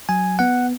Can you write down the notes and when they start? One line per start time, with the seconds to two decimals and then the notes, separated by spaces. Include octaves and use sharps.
0.09 F#3 G#5
0.39 B3 F#5